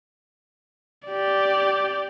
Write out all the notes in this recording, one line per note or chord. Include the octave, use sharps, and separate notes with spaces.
G4 D5